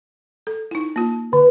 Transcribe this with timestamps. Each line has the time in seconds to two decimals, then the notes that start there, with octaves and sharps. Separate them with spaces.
0.47 A4
0.71 D#4 E4
0.96 A#3 F4
1.33 D3 B4